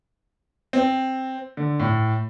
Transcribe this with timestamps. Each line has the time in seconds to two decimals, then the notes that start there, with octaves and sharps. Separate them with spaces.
0.73 C4
1.57 D3
1.80 A2